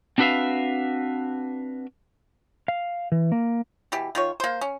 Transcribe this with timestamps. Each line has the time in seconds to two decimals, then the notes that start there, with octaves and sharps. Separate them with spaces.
0.18 C4 D4 F#4 B4 E5 F5
2.68 F5
3.12 E3
3.32 A#3
3.92 B2 E3 G4
4.15 D#3 F4 C#5
4.40 A#3 C5
4.61 C#4